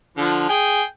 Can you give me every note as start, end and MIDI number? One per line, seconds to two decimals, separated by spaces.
0.17 0.46 50
0.17 0.46 53
0.49 0.82 68
0.49 0.82 79
0.49 0.82 80